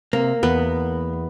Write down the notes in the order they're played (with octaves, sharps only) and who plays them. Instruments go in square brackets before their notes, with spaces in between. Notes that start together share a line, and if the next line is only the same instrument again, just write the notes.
[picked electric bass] C3 [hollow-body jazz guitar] A#3
[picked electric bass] E2 [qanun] B3